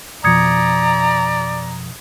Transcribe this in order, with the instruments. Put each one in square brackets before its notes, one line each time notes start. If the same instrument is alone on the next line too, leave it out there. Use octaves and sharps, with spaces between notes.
[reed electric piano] F2 B2 F3 [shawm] D5 [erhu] A#5 [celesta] D#6 G#6 C#7